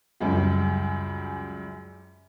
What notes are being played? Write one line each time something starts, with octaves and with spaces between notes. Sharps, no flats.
C#2 F#2 G3